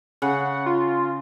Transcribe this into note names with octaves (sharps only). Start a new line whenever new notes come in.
C#3 F#5
F4